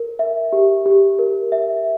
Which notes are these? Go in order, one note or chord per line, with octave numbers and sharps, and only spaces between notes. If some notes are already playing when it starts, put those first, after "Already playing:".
Already playing: A#4
E5
G4
G4
A#4
E5